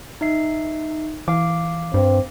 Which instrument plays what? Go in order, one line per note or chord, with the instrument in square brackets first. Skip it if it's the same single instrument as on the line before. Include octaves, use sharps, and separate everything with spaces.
[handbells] D#4 E5 C7
[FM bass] E3 [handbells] F5 D6
[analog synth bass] G2 [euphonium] C4